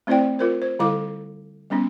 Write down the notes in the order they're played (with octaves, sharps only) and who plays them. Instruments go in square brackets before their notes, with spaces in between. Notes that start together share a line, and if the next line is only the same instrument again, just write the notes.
[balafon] A3 C4 E4 C5 D5 G5
F4 A#4 C5
C5
D3 G3 E4 A4 F5 D6
G3 B3 C#4 D#4